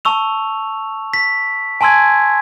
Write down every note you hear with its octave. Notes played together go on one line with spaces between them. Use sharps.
A5 C#6 E6 F7
B6
G#5 A5 C6 E6 G#6